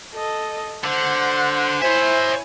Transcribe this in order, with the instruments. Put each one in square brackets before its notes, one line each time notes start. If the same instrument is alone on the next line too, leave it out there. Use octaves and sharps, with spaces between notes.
[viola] A4 D#5
[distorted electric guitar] D3 [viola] C5 F#5
[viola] E4 G#5 [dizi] C5 [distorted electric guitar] C#5 E5